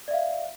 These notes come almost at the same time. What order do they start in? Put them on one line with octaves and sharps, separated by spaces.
D5 E5 F5